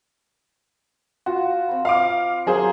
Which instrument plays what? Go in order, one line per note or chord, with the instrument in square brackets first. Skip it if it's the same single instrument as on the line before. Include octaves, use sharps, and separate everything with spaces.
[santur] F4 [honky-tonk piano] F#4
[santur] C4 B5
[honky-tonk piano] F5 D6
[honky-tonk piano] F#3 G#4 C5 [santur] A#4 E5 F5